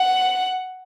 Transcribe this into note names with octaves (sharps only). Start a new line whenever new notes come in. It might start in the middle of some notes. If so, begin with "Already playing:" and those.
Already playing: F#5